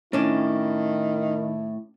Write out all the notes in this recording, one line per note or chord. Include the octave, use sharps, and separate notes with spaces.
A2 D#3 C#4 D4 E4